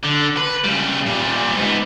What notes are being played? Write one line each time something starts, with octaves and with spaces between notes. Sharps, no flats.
D3
B4
C#3 G3
A#2 G3
G#2 B3